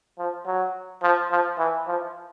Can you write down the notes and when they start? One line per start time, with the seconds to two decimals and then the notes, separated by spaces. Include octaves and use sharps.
0.19 F3
0.46 F#3
1.03 F3
1.31 F3
1.58 E3
1.87 F3